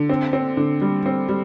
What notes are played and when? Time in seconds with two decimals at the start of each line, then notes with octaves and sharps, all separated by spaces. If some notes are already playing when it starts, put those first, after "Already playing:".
Already playing: D3
0.09 C4
0.33 C4
0.57 D3
0.81 G3
1.06 C4
1.29 G3